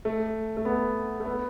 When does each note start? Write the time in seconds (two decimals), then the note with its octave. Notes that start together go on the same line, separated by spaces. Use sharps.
0.05 A3
0.57 A3
0.65 B3
1.20 A3
1.26 B3